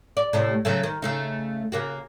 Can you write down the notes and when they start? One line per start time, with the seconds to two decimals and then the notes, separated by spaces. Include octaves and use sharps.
0.17 D5
0.33 A2 C3 A3
0.65 C#3 F#3 A3
0.83 D#3
1.02 C#3 A3 D#4
1.72 C#3 A#3 F#4